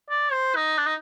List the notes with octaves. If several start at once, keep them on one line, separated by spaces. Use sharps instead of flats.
D5
C5
D#4
D4
D#4